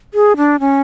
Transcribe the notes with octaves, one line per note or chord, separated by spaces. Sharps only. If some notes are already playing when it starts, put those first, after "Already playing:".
G#4
D4
C#4